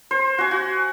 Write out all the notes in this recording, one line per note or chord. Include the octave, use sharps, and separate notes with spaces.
C5
F#4 G#5
F#4